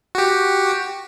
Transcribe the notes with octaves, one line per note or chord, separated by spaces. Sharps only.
F#4 G4